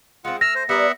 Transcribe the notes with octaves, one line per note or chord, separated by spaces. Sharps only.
G#3 C4 F4 F#5
A3 E6 F6 A#6
C5
G3 B3 A#4 D5 E5 F#5